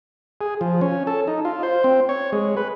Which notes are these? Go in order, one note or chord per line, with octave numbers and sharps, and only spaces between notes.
G#4
F3
C#4
A4
D#4
F4
C5
C4
C#5
G#3
B4